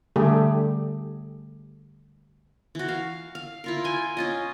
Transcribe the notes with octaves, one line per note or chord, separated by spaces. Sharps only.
D3 G3 A3 G4 G#4
E3 F#4
F5
F5
E4 F4 A#4
G5 G#5
C#4 F4 D#5